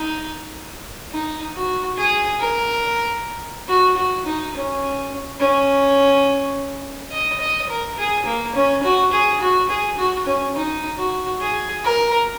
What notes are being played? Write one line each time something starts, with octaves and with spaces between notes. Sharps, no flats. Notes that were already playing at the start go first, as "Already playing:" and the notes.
Already playing: D#4
D#4
F#4
G#4
A#4
F#4
F#4
D#4
C#4
C#4
D#5
D#5
A#4
G#4
A#3
C#4
F#4
G#4
F#4
G#4
F#4
C#4
D#4
F#4
G#4
A#4